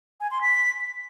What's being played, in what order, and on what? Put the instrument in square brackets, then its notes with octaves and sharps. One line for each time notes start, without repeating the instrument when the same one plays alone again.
[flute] G#5
C6
B6